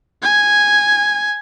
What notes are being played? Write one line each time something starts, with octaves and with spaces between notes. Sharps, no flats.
G#5